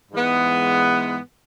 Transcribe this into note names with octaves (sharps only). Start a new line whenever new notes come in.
G#2 E3 G#3 B3